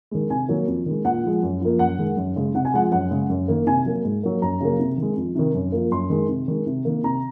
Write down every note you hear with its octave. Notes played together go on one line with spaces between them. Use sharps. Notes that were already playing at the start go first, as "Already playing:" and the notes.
D#3 G#3
C3 G#5
D#3 F#3 A#3
F2
D#3 G#3
A#2 F#5
F3 G#3
F#2
F3 A#3
F#2 F#5
D#3 G#3
F#2
C#3 G#3
C3 F#5
G#5
F3 G#3 F#5
F#2 F#5
C#3 G#3
F#2
D#3 A#3
C3 G#5
F#3 A#3
G#2
F#3 A#3
F#2 A#5
C#3 F#3 A#3
C3
D#3 G#3
F2
C3 D#3
F#2
F3 A#3
F#2 C6
D#3 G#3
C3
D#3 G#3
C3
D#3 A#3
C3 A#5